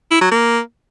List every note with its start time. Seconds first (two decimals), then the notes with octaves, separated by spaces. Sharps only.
0.11 E4
0.21 F#3
0.31 A#3